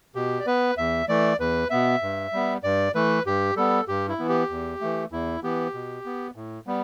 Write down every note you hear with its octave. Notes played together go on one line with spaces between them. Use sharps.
B2 G4
D5
B3 B4
E2 E5
E3 A3 D5
E2 B4
B2 B3 E5
G2
G3 B3
G2 D5
E3 A3 B4
G2 G4
G3 B3 A4
G2 G4
E4
E3 B3
G4
E2
E3 A3
E2 E4
E3 B3 G4
B2
B3
A2
G3 B3